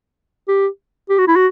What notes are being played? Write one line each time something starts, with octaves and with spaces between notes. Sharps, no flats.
G4
G4
F#4
E4
F#4